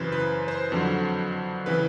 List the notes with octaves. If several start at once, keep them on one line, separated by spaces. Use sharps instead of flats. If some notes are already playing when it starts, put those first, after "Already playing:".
Already playing: F#2 C#3 E3 B4 C5
B4
C5
F2 D3 F#3
C#3 E3 B4